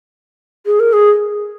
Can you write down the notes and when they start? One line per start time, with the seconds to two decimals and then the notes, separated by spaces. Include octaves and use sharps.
0.66 G#4
0.80 A#4
0.93 G#4